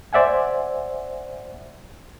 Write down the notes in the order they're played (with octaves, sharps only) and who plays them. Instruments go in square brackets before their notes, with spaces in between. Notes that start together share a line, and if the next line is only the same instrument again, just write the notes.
[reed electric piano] C5 D5 E5 F#5 G#5